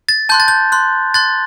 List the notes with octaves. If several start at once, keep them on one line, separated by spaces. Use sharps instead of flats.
A6
A5 C6 F#6 G6
A6
G6
C6 F#6
C6 F#6 A6